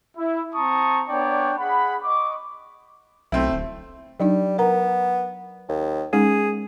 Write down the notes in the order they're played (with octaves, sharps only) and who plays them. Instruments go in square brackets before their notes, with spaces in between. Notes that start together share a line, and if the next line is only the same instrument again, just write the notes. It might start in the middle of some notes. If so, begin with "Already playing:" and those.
[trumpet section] E4
C4 A5 A#5 C#6 D#6
B3 D4 C#5 D5 G5
G#4 F#5 B5
D#5 C#6 D6
[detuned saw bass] B1 [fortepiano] A3 C4 E4
[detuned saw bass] D1
[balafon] F#3 D4 D#4 [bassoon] G3
[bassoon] B3 [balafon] A#4 A#5
[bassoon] D#2
[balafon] G#3 C#4 D#4 [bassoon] G#4